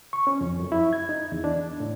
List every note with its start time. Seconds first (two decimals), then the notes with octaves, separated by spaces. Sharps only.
0.13 C#6
0.27 C#4
0.41 F2
0.60 F#2
0.72 E4
0.93 G#6
1.09 D#4
1.32 E2
1.44 D4
1.80 A2